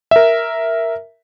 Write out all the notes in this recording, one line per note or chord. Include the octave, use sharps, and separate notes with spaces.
A#4 E5